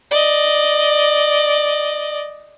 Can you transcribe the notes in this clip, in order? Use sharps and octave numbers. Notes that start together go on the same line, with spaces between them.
D5 D#5